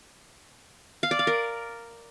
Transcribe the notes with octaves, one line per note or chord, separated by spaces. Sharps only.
F5
D5
F5
A#4